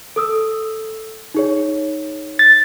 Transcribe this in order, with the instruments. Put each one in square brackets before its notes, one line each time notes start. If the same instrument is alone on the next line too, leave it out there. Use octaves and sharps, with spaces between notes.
[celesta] A4 D#6 E6
D#4 G#4 C#5
[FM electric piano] A6